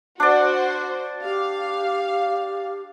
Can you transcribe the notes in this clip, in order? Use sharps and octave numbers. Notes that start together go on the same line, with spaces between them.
D4 F#4 C5 D5
G4 F5